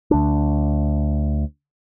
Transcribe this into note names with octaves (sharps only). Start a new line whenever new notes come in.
D2 D4